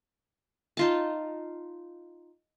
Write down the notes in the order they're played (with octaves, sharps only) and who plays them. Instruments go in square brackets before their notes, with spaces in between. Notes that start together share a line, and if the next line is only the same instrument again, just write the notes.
[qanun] D#4 F4 A5